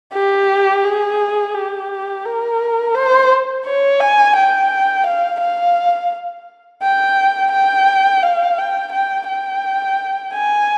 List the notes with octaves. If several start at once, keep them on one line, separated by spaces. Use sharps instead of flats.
G4
G#4
G4
A#4
C5
C#5
G#5
G5
F5
F5
G5
G5
F5
G5
G5
G5
G#5